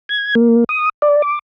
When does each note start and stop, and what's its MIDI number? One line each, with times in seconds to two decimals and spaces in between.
0.09 0.35 92
0.35 0.64 58
0.69 0.89 87
1.02 1.22 74
1.22 1.39 86